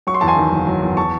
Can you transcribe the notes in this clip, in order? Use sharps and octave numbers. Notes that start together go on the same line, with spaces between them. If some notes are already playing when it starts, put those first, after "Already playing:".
F#3 C#6
C6
E2 A5
G#5 C6
D#3
F#1
F#3
E2
A5 C#6